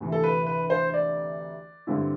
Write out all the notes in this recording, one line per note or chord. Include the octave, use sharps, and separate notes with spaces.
D2 C3 E3
A4
B4
B4
C5
D5
G2 D3 G3 C4 E4